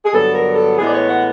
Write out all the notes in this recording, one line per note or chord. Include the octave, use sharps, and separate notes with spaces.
G#4
G2 D3 F#3 B3 A4
A#4
A4
A2 E3 G#3 B3 G#4
D5
C#5
F#5